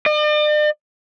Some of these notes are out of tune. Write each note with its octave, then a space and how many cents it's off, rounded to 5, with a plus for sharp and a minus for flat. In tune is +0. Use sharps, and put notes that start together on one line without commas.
D5 +45